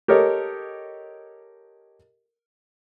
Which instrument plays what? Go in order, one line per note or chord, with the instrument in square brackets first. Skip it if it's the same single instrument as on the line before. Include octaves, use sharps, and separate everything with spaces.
[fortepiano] G4 A4 A#4 C#5 D#5